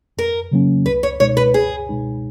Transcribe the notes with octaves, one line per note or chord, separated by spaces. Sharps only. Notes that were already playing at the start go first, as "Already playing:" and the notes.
F2 A#4
C#3 F#3 A#3 C#4
C#2 B4
C#5
B2 G#3 D#4 C#5
B4
C#2 G#4
B2 G#3 D#4